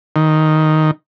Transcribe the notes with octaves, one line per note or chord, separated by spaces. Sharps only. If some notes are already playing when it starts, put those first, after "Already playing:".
D#3